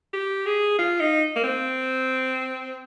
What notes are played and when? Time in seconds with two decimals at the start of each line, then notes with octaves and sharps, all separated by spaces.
0.13 G4
0.46 G#4
0.79 F4
1.00 D#4
1.36 A#3
1.44 C4